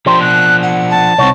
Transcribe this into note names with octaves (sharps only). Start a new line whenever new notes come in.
F3 D4 G4 C5 A#5
B2 F#6
F#5
A5
C2 C4 D#4 C#5 F#5